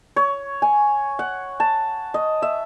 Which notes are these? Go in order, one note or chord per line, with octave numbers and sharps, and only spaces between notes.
C#5
G#5
F#5
A5
D#5
E5